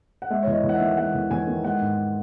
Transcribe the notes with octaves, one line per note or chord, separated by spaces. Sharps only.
F#5
G#3 E5
E2 C#5
D#5
E2
F#5
E5
D#3
G#3 F#5
E2
E2 G#5
D#3
G#3 F#5
G#2